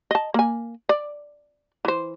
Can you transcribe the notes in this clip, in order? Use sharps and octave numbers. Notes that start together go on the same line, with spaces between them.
D#5 A5
A#3 G#5
D5
E3 C5